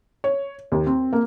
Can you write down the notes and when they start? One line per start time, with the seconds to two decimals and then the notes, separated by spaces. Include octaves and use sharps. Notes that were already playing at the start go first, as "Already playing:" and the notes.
0.24 C#5
0.72 D#2
0.87 C4
1.13 A#3